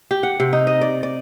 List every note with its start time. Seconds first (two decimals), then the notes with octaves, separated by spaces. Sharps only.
0.11 G4
0.23 F#5
0.40 C3
0.53 D#4
0.67 D#5
0.81 D5
1.03 D5